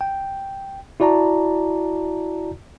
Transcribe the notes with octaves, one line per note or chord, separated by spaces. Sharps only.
G5
E4 F#4 D5 A5 A#5